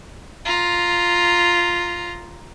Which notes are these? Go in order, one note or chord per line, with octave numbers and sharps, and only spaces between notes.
F4 A#5